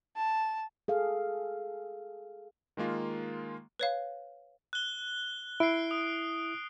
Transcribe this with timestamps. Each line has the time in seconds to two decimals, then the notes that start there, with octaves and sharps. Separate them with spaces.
0.16 A5
0.88 G#4 A4 F5
2.77 D#3 G#3 A#3 F4
3.79 B4 C#5 F5
4.73 F#6 G7
5.60 E4 C7 D7
5.91 D#6